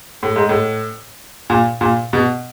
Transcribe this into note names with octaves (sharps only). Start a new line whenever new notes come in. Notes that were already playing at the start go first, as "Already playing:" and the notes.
A2
G#2
A2
A#2
A#2
B2